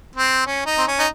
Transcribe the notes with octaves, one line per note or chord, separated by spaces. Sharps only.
C4
C#4
D#4
C4
C#4
D#4